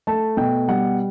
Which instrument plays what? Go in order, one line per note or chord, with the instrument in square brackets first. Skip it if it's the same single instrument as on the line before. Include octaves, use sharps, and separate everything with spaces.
[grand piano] A3 A5
B2 G5
G3 F#5